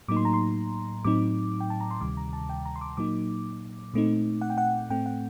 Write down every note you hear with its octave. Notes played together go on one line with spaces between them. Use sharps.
A2 F#3 A#3 D#4 D6
C6
A#5
C6
A2 F#3 C4 D#4 D6
G5
A5
A#5
C6
D2 C3 D#3 G3 D6
A#5
A5
G5
A#5
C6
D6
A#2 F#3 A#3 D#4 D6
A#2 A3 C4 D#4
F#5
G5
F#5
A2 A3 C4 G5
F#5